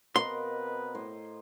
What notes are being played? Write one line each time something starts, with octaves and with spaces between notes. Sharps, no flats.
B2 C4 A#4 B4 D#5 F5 C6
A2 C5